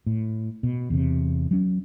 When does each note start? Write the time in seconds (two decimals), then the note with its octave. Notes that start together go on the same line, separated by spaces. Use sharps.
0.06 A2
0.63 B2
0.90 E2 C3
1.51 F#3 C#4